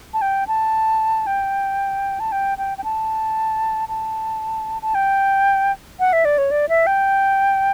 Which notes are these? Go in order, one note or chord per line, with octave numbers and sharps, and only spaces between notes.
A5
G5
A5
G5
A5
G5
G5
G5
A5
A5
A5
G5
F#5
E5
D5
C#5
D5
E5
G5